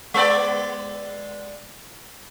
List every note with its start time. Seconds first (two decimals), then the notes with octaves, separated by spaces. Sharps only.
0.14 G#3 B3 D5